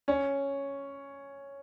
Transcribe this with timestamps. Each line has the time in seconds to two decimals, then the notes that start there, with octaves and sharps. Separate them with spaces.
0.08 C#4